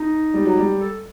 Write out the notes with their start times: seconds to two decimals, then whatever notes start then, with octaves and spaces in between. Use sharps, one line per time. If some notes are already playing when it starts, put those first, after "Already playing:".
Already playing: D#4
0.34 G3
0.45 F#3
0.57 G3
0.80 A4